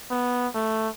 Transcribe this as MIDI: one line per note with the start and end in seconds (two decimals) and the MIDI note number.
0.11 0.47 59
0.55 0.88 57